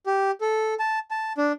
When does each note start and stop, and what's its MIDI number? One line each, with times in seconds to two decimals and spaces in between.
0.06 0.31 67
0.41 0.74 69
0.79 0.99 81
1.11 1.33 81
1.38 1.52 62